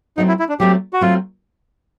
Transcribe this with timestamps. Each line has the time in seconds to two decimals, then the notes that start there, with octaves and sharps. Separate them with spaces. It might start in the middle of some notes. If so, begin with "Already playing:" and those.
0.17 F#3 A3 C4 D#4
0.28 E4
0.39 E4
0.49 D4
0.60 F#3 A3 C4 G4
0.93 F#4
1.01 F#3 A3 C4 F4